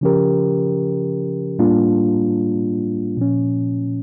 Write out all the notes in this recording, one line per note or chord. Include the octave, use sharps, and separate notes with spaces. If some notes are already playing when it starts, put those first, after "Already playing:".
C#3 F3 C#4 G4 A#4
A2 G3 A#3 D4 F4
A#2 F3 C#4